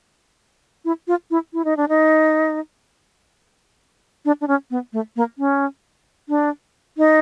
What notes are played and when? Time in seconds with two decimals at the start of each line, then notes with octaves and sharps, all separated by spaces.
0.85 E4
1.08 F4
1.31 E4
1.53 E4
1.65 D#4
1.77 D4
1.89 D#4
4.25 D4
4.41 D4
4.48 C#4
4.71 B3
4.93 A3
5.16 A#3
5.38 C#4
6.29 D4
6.97 D#4